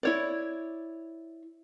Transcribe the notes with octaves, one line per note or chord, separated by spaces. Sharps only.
E4 C#5 D5